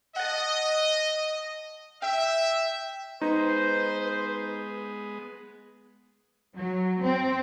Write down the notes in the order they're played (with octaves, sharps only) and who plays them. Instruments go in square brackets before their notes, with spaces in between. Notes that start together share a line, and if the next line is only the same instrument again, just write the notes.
[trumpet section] D#5 [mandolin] F#5 A5
[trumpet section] E5 [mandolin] G5
[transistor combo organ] G#3 B3 [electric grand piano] D#4 [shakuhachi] B4 [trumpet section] C5
[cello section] F#3
C4